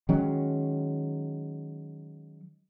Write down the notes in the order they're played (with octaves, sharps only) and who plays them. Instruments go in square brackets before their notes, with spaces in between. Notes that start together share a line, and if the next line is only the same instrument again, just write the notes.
[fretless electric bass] D#3 F#3 G#3 C#4